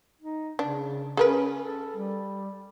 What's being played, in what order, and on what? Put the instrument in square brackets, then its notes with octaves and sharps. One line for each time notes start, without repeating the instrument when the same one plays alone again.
[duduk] D#4
[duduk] C#3 [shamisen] D4
[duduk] C#4 [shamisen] G#4 A#4 B4
[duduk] A4
G3